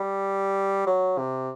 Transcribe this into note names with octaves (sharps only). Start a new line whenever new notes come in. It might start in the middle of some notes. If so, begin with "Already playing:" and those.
Already playing: G3
F#3
C3